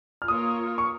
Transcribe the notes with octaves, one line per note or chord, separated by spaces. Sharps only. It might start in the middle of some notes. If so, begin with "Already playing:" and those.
F6
A#3 F4 A#4 C#5 D#6
C#6